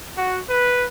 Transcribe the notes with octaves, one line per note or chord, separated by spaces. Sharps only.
F#4
B4